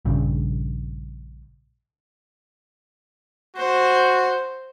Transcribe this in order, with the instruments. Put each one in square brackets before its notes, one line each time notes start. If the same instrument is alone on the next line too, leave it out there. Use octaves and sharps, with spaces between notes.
[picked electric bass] A#1 G2 C#3
[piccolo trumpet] F#4 [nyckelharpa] C5